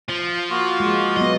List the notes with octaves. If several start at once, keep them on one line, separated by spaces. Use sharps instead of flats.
F3
F5
A#3 F4 F#4
G#3
F#3 B3 D#5